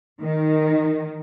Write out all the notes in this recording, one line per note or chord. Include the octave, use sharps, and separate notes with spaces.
D#3